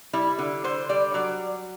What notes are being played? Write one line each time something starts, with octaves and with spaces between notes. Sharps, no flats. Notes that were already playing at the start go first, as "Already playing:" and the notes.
G3 E4
D3
D3 C5
G3 D5
F#3 D5